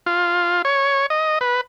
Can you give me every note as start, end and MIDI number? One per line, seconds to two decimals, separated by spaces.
0.06 0.62 65
0.65 1.06 73
1.10 1.39 75
1.41 1.61 71